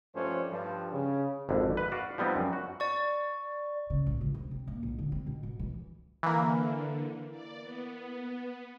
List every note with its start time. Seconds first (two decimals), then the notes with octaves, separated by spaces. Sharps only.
0.15 G2 F3 A3 C#4 D4 C5
0.51 G2 F3 G3
0.92 C#3
1.49 G#1 F2 D3
1.77 B4
1.92 F#4 D5 F5
2.18 F3 G3 B3 C4 D#4
2.36 F#2
2.53 F#4
2.80 D5 C#6
3.90 C#3
4.07 A#1
4.21 C#2
4.34 C3
4.51 C4
4.68 A#3
4.83 B1
4.99 D3
5.12 C4
5.27 B2
5.43 B2
5.59 E3
6.23 D3 E3 A#3
7.31 D5
7.62 B3